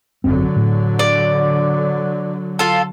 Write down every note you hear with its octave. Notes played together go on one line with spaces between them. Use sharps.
G#1 F#2 D3 F#3 C4
A2
D5
F4 A4